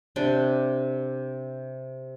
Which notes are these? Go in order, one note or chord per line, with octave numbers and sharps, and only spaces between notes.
C3 D4 G5